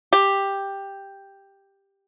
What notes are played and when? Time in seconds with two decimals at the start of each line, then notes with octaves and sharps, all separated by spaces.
0.13 G4